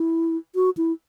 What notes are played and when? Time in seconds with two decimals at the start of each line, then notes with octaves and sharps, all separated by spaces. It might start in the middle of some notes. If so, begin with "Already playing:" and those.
Already playing: E4
0.55 F#4
0.77 E4